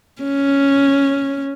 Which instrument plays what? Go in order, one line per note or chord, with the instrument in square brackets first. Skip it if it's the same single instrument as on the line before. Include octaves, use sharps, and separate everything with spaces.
[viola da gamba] C#4